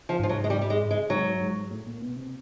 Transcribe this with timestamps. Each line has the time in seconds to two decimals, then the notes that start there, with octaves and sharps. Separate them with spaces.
0.09 F3
0.20 G#2 F3
0.29 F#3
0.44 G#3
0.50 G3
0.62 G3
0.70 G#3
0.91 G#3
1.10 G#2 F#3
1.40 G#2
1.71 A2
1.87 A#2
2.02 B2
2.16 C3